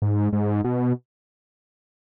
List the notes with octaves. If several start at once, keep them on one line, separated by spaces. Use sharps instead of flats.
G#2
G#2
B2